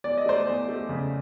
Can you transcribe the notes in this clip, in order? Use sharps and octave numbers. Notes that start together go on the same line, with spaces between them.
E2 D5
D#5
A3 C5 D5
E2
A3
C#3